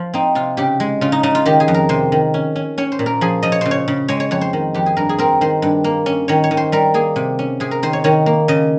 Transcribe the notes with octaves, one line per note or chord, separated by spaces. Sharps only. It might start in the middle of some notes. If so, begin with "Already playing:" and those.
Already playing: F3 F4
C4 D#4
C3 F4
C#3 G4
G#3
C#3 F4
D#4
C#3 D#4
F4
D#3 G4
G#4
F2
A#4
C3 C5
D#3
C#4
C#4
C#4 C#5
C5
A#2
A#4
F3 G#4
F3 D#5
C#5
C#3 C5
C#5
C#3
G#3 C#5
C#5
F2 C#5
C5
D#3
F2 G4
G#4
G2 A#4
G#4
C4 A#4
D#3 C5
G2
A#3
C#4
D#3 C#5
C#5
D#3
C5
G3 A#4
A#3 G#4
C3
C#4
C3 G#4
A#4
D#3 C5
C#5
D#3 C#5
A#3
C#3 D#5